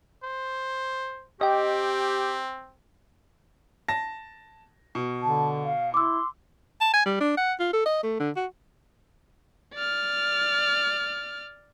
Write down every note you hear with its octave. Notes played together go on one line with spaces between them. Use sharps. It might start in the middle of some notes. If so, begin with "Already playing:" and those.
C5
C4 G4 D#5 G5
A5 A#6
B2
D3 A5
F5
E4 C6 D6 E6
A5
G#5
G3
D4
F#5
F4
A4
D#5
A3
D3
F#4
D5 F6